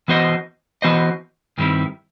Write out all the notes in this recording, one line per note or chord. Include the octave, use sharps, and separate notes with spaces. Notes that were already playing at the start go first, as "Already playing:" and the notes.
E3 B3 F#4 C5 D#5
E3 B3 F#4 C5 D#5
G2 D#3 G3 C4 E4